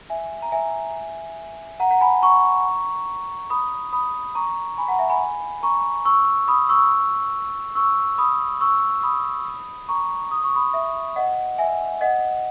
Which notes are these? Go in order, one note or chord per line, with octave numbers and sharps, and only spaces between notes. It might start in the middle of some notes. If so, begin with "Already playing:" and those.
E5 G#5
A#5
E5 G#5
F#5 A#5
F#5 A#5
G#5 B5
A#5 C#6
B5 D#6
B5 D#6
A#5 C#6
G#5 B5
F#5 A#5
E5 G#5
G#5 B5
A#5 C#6
C#6 E6
B5 D#6
C#6 E6
C#6 E6
B5 D#6
C#6 E6
B5 D#6
A#5 C#6
D#6
C#6
B5 D#6
E5
D#5 F#5
E5 G#5
D#5 F#5